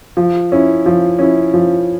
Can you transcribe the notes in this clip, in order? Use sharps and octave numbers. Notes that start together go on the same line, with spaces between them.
F3
C#4 E4
F3
C#4 E4
F3